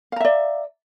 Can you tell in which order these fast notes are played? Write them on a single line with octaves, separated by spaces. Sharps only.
F5 A#5 E5 D5